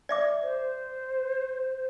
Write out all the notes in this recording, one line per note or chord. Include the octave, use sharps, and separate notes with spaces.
D5 E5 D6
C5